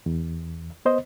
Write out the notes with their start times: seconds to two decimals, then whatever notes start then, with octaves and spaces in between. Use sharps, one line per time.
0.06 E2
0.85 B3 C5 D#5